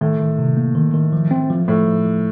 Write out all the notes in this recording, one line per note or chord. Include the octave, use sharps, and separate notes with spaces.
A2 D#3
D#3
C3
A#3
D#3
D#3
F3
C4
F3
A2 F3
F3
F3